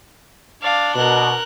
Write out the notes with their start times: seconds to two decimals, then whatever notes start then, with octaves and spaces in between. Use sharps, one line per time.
0.63 D4 D5 F5
0.95 B2 A#4 F#6